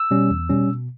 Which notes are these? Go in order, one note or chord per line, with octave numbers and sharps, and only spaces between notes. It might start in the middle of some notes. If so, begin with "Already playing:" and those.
Already playing: E6
B2 G3 C#4
E2
B2 G3 C#4
B2